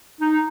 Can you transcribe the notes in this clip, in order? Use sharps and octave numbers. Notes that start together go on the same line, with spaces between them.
D#4